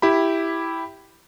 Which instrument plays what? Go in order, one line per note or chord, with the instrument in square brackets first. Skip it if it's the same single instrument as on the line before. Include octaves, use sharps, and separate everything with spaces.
[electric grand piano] E4 G4 B5